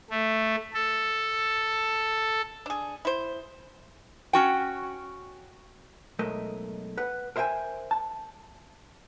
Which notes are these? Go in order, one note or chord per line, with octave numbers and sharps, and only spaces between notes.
A3
A4
D4 G#4
E4 C5
C#4 F#4 G5
B1 G#3 A3 A#4 D#5
B4 F#5
A#4 C5 E5 F5 G5 G#5
A5